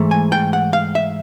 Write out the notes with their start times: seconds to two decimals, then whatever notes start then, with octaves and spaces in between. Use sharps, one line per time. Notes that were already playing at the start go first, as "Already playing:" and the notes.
Already playing: G#2 E3 A3
0.11 G#5
0.32 G5
0.53 F#5
0.73 F5
0.95 E5